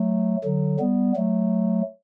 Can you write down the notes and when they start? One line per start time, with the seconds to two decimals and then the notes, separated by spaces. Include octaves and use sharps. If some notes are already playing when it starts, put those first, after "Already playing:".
Already playing: F#3 A3
0.44 D3 F#3
0.79 G3 B3
1.16 F#3 A3